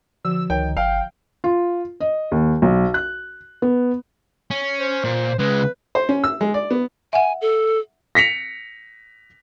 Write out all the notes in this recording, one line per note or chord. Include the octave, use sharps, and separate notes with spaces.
D3 F3 F#4 E6
C#2 D#3 C#5 G5
G1 F5 G5
F4
D#5
D#2
B1
F#6
B3
C#4
C5
A#2
C#3 G#3 B4
C5
C#4
E6
G#3
D5
B3
E5 F#5 G#5
A4
A#6 B6 C#7 F7